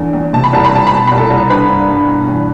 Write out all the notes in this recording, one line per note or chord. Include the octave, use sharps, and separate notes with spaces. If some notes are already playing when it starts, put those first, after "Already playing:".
Already playing: E2 D3
E2
C3 A5
B5
C2 A5
B5
C2 A5
B2 B5
A5
C2 B5
A4 A5
C2
D3 B4 B5
G2
G2
B2
E2